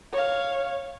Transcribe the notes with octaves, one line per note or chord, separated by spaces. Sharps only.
C#5 F5